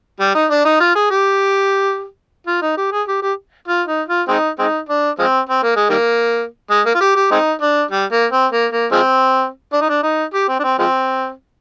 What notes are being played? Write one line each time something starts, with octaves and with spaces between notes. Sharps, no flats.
G3
D#4
D4
D#4
F4
G#4
G4
F4
D#4
G4
G#4
G4
G4
F4
D#4
F4
G#3 C4 D#4
G#3 C4 D#4
D4
F3 G#3 C4
C4
A#3
G#3
D#3 G3 A#3
G#3
A#3
F4
G4
G4
G#3 C4 D#4
D4
G3
A#3
C4
A#3
A#3
F3 G#3 C4
D4
D#4
D4
D#4
G4
C4
D4
C4
F3 G#3 C4